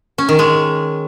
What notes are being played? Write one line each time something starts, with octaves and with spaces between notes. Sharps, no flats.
C#4
D#3
G#3